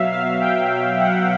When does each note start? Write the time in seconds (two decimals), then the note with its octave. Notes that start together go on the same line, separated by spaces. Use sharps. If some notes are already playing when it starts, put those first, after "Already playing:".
Already playing: B2 F#3 E5 F5
0.11 F5
0.41 G5
1.00 F#5